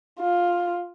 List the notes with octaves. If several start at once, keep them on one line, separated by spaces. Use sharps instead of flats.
F4